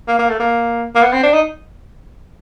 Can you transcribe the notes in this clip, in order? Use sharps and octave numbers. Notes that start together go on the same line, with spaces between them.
A#3
A#3
A3
A#3
A#3
B3
C4
D4
D#4